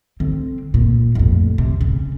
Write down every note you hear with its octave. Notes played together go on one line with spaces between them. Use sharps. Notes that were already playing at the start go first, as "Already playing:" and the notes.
D3 C4
A#2
A1 F2
C3
C#3